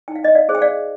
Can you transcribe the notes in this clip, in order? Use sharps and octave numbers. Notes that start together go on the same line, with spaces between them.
D#4 G5
F5
D#5 G5
D5 F5
G#4 C5
G5
D5 F5